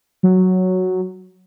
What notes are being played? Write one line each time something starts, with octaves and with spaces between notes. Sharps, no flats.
F#3